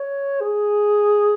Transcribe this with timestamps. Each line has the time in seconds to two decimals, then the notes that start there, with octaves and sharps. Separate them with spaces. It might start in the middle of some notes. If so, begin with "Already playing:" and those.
Already playing: C#5
0.40 G#4